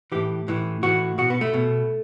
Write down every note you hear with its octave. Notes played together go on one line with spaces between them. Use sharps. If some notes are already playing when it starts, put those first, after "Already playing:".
A2 E3 G4
A2 E3
A2 E3 F#4
B2 F#4
B3
A3
B2